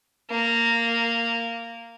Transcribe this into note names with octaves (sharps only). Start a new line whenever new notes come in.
A#3